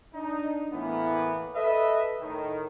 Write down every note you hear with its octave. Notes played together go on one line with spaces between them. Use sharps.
D4 D#4
A2 E3 A#3 B3
A4 B4 D#5 E5
A2 D#3